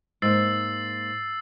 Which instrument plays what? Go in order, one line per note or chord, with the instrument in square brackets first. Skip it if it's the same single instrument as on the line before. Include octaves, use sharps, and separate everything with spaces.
[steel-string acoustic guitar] G#2 A#3 [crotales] E6 A6 C7